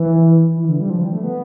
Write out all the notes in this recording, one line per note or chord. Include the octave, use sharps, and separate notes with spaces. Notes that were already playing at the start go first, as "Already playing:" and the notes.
Already playing: E3
E3
D3
G3
F3
G3
A3
B3